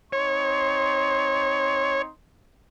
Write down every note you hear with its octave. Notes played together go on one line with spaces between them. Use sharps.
C4 D#4 C#5 C6